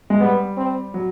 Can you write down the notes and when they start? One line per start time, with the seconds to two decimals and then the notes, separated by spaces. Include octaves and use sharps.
0.10 G#3
0.20 G3 B3
0.57 C4
0.94 F#3